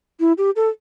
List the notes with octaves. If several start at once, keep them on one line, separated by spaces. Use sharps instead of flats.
E4
G4
A4